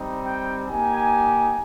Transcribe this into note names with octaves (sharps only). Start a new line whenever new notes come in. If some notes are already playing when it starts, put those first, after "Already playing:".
Already playing: G3 C4 D#4
G5
A#3 D#4 G4 G#5